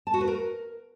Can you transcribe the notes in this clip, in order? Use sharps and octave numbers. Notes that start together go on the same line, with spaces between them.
A5
F#4
B4
A#4